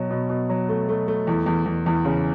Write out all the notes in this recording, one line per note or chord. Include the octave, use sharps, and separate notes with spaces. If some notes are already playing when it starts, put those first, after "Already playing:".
Already playing: B2 F#3
B2
B2
F#3
A3
A3
A3
E2
E2
E2
E2
C#3